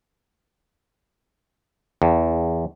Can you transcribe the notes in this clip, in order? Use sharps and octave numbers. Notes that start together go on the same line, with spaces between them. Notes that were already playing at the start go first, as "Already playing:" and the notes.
E2